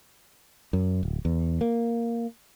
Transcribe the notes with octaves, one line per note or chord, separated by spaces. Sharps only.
F#2
D1
E2
A#3